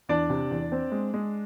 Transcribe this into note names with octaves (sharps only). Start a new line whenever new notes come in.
E2 D4 D5
C3
E2
C4
G#3
G#3